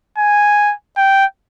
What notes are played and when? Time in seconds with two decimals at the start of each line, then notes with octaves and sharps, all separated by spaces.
0.18 G#5
0.97 G5